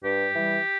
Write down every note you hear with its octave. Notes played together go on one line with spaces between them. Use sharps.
G2 G4
E3 G3